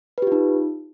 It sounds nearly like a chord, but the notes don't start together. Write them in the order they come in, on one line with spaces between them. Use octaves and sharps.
B4 G4 F4 D#4